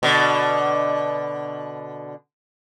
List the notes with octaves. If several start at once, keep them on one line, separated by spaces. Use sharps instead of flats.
B2 D3